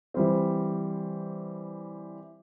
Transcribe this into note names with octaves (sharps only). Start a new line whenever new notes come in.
E3 G3 C4